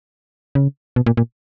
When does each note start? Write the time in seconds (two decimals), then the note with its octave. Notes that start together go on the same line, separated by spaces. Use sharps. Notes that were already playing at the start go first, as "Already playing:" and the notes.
0.55 C#3
0.96 B2
1.06 A#2
1.17 A#2